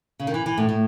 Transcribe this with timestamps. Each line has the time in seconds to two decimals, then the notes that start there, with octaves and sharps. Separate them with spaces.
0.20 C#3
0.27 D#3
0.34 E3
0.46 E3
0.58 A2
0.69 A2